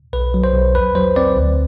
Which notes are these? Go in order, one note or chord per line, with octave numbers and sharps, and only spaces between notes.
B1 B4
F#3
C5
B1
E2 B4
F#3 C5
C4 D5
D2